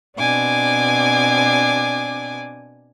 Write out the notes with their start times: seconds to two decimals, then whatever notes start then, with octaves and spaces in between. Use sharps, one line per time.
0.18 B2 C4 D4 G#5 D6